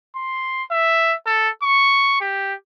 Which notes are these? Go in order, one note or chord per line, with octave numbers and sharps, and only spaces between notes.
C6
E5
A4
C#6
G4